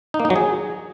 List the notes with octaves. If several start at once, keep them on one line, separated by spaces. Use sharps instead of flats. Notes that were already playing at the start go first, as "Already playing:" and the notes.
D#4
A#3
D#4
F#3
G#4